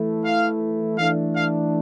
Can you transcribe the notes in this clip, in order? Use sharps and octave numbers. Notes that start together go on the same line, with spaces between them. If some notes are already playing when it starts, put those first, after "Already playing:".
Already playing: E3 A3 E4
F5
E3 A3 D4 F5
F5